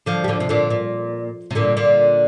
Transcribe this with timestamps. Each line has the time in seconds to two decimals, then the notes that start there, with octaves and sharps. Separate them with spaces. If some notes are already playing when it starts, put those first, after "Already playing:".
0.06 D3 F3
0.24 G3
0.28 D3 F3
0.40 C3
0.49 A#2 D3
0.70 A#2
1.51 C3
1.55 A#2 D3
1.77 A#2 D3